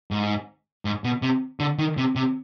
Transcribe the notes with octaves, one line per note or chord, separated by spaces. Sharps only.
G#2
G#2
B2
C3
D3
D#3
C3
C3